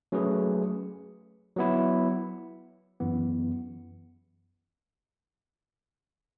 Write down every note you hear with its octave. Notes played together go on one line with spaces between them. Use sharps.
F#3 A3 C#4 G#4 B4
F#3 B3 E4
F#2 E3 B3